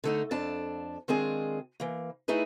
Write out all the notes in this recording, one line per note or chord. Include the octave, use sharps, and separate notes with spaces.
D3 A3 D#4
F2 D4 A5
D#3 G#3 C4 D4 F4 G#4
E3 A#3
A3 D#4 E4 G#4 B4